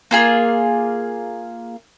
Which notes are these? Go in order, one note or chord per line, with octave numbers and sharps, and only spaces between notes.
A#3 F4 G#4